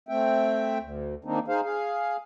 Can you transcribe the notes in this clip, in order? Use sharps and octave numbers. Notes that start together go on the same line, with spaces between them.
A3 C4 E5 G5
D2
D#3 A#3 C4 D4 D#4
D#4 G#4 C5 F5
G#4 F5